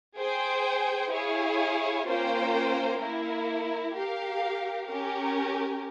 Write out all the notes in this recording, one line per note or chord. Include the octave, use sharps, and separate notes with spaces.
G#4 C5 G5
E4 G#4 C#5 F5
A#3 C#4 F4 C5 G5
A#3 E4 A#4
G4 A#4 F5
C#4 G4 A#4